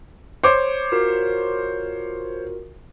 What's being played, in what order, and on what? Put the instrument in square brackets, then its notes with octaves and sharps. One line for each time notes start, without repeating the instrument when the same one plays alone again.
[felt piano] C5 C#5 D6
[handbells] F4 F#4 A#4